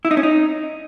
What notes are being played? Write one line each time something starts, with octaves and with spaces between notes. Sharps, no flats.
E4
D#4
C#4
D#4